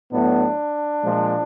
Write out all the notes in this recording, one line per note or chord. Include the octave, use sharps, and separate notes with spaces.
A2 F#3 B3 D4
A#2 F3 G#3